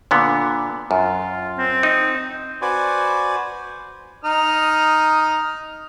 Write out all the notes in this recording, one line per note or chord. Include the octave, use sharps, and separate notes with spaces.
A#2 D3 B3
F#2 F4
C4
D#4
F#4 B4 C5 D5 G#5
D#4 D#6 F6